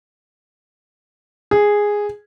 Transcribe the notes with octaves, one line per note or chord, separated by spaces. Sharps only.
G#4